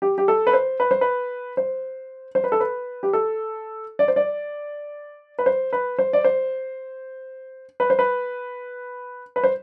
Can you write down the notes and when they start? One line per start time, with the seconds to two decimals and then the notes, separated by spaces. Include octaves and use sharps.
0.02 G4
0.18 G4
0.28 A4
0.47 B4
0.53 C5
0.80 B4
0.91 C5
1.01 B4
1.57 C5
2.35 C5
2.44 B4
2.52 A4
2.60 B4
3.03 G4
3.13 A4
3.99 D5
4.08 C5
4.16 D5
5.39 B4
5.46 C5
5.73 B4
5.99 C5
6.13 D5
6.24 C5
7.80 B4
7.90 C5
7.99 B4
9.36 B4
9.44 C5